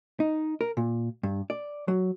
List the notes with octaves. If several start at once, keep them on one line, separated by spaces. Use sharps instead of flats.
D#4
A#4
A#2
G2
D5
F#3